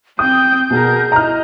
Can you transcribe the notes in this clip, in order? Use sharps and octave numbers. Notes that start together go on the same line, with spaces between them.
C4 G5 D#6 G6
B2 G#4 A#4
E4 D#5 A#5 F6